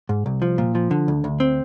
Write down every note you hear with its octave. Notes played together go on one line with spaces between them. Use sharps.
G#2
C2
F3
A#2
F3
D3
D2
D2
C4